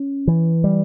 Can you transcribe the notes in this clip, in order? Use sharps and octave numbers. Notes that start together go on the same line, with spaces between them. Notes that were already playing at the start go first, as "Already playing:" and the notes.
Already playing: C#4
E3
G3